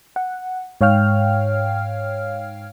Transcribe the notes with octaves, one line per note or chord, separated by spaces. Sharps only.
F#5
G#2 C#5 F5 G5 F6